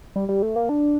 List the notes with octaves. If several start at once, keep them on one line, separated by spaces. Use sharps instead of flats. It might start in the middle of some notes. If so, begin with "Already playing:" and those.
G3
G3
A3
A#3
D4